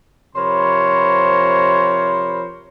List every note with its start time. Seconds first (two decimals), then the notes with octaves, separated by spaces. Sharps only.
0.36 C3 F3 A#4 C5 C#5 B5